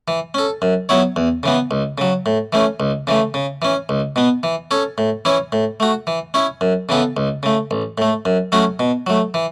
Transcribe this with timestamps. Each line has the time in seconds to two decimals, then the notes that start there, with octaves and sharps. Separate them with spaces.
0.08 E3
0.34 C#4 A4
0.62 F#2
0.89 F#3 B3 E4 C#5
1.16 E2
1.43 C#3 E3 B3
1.71 C#2
1.98 C#3 F#3
2.26 A2
2.53 E3 A3 C#4
2.80 C#2
3.07 C#3 E3 A3
3.34 C#3
3.62 E3 C#4
3.89 C#2
4.16 B2 B3
4.43 E3
4.71 C#4 A4 C#5
4.98 A2
5.25 E3 C#4 E4 C#5
5.52 A2
5.80 A3 F#4
6.07 E3
6.34 C#4 E4 C#5
6.61 F#2
6.89 C#3 E3 B3 A4
7.17 C#2
7.43 C#3 A3
7.71 A1
7.98 A2 A3
8.25 F#2
8.52 F#3 A3 C#4 F#4
8.79 B2
9.07 F#3 A3
9.34 E3